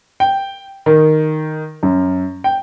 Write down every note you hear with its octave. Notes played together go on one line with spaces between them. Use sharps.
G5
D#3
F#2
G5